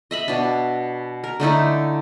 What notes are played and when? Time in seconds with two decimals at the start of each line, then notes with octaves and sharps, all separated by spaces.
0.11 D#5 E5 B5
0.28 B2 D4
1.24 A#4
1.40 D3 A3 D#4 E4